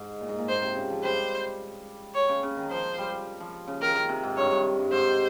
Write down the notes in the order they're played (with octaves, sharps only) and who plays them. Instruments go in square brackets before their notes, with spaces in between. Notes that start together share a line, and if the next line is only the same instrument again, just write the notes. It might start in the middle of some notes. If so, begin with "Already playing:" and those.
Already playing: [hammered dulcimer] G#2
A#2
G#2
A#2
[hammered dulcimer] G#2 [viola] C5
[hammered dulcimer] C3
C#3
F3
[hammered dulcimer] G3 [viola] C5
[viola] C#5
[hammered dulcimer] C#3
C#3
D#3
[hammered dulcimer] F3 [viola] C5
[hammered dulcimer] G3
F3
C#3
[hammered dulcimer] D#3 [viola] A#4
[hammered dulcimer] D#3
C3
G#2
[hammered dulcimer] G2 [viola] C#5
[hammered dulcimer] G2
G2
[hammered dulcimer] G#2 [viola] C5